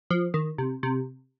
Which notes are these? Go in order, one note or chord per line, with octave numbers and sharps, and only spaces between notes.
F3
D#3
C3
C3